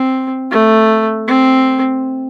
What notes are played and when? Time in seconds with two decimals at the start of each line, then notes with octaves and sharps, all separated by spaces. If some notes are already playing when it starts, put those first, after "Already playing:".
Already playing: C4
0.51 A3
1.28 C4